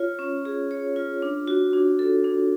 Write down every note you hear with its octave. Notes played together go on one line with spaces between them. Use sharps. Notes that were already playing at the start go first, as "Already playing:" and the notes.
Already playing: F4 C#5
C#4
G#4
C#5
F4
D4
F#4
D4
A4
D4